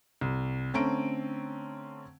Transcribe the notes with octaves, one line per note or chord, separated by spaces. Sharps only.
C2
D3 A3 C4 C#4 A#5 D7